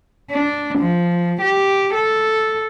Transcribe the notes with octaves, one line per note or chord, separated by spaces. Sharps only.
D4
F3
G4
A4